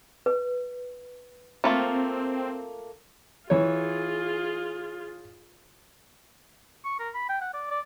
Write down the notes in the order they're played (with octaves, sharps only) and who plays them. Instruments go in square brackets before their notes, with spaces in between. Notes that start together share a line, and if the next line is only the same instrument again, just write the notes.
[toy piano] B4
[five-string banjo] A3 A#3 F4 [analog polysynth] C4
[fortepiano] E3 C#5 [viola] F4 G#4
[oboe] C#6
A#4
B5
G5
F#5
D5
D5